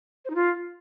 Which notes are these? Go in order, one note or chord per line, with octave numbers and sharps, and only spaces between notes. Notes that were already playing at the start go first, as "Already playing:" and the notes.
C5
D#4
F4